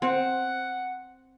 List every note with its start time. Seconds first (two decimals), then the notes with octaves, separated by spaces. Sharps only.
0.02 C4 F#5